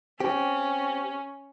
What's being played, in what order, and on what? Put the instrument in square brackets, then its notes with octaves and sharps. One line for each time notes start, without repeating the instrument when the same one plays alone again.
[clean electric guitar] C4 G4 [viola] C#4